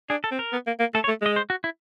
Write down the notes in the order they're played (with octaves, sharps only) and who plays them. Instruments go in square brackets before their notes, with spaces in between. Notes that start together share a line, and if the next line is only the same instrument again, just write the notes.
[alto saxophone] D4 [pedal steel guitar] G#4
[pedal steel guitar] A4
[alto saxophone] C4
[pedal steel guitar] A#4
[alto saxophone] B3
A#3
A#3
[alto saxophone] A3 [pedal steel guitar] A4
[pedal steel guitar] C#5
[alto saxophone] A3
[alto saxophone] G#3 [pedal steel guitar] D#5
[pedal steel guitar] C5
F#4
E4